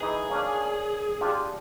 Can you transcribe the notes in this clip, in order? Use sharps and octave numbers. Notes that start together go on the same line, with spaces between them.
E3 D#4 G#4 D#5
A#3 C#4 D4
D4 F4 G4